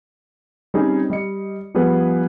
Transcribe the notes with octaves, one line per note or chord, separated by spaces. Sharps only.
G3 C4 C#4 D#4 G#4
G3 D#5 C#7
F3 G3 B3 G#4 B4